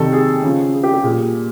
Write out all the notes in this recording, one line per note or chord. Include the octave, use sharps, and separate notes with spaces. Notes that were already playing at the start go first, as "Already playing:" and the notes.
Already playing: C3 D#3 G3 A4
G#4
C#3 F3
G#4
G4
G4
A#2 G3 G#4